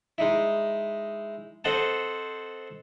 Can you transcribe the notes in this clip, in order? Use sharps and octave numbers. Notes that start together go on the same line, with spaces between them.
G#3 D#4 E4
C4 A4 C5 D#5 F#5 A5